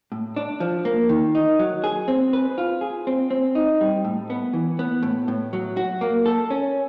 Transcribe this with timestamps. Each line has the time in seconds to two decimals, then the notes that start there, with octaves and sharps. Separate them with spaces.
0.12 A2
0.36 D4
0.60 F3
0.85 A#3
1.09 D#3
1.35 D#4
1.59 F#3
1.84 G#4
2.08 C4
2.33 B4
2.58 F4
2.81 G#4
3.07 C4
3.30 C4
3.55 D#4
3.81 G3
4.05 A2
4.30 B3
4.53 E3
4.79 B3
5.03 A2
5.28 A2
5.53 F#3
5.77 F#4
6.01 A#3
6.26 A4
6.50 C#4